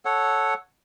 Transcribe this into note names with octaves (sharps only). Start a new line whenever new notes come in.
A4 C#5 F#5